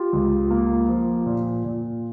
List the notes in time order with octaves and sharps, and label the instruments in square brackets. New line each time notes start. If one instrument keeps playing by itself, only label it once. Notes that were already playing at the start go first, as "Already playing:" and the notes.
Already playing: [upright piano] F4 G4
[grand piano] C#2
A#3
F3
A#2
A#2